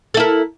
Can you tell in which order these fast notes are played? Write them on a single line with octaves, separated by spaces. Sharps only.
A4 E4 A#4